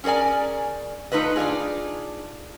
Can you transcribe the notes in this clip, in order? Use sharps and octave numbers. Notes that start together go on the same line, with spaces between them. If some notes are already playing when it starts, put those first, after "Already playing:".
C#4 G#4 A#4 D5 G#5
A3 D#4 F4 B4 D#5
D4 D#4 F4 G#4